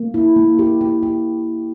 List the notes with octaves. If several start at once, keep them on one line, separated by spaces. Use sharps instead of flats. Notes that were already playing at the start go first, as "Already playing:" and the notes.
Already playing: A#3
E4
A#3
G4
G4
G4